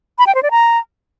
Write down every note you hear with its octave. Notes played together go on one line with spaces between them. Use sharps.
B5
G5
C5
D5
A#5